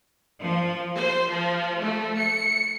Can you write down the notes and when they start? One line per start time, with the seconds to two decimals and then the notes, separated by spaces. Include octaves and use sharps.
0.41 F3
0.96 C5
1.29 F3
1.80 A3
2.18 C#7